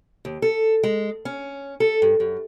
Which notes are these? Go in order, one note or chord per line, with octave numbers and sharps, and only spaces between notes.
D#2
A4
G#3
C#4
A4
G2
F#2